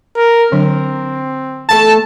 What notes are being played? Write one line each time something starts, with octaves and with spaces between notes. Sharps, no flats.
A#4
D3 F#3 C4 D4
E2 A3 A4 A5